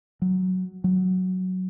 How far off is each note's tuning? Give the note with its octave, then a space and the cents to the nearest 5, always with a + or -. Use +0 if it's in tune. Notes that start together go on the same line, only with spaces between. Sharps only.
F#3 +5
F#3 +0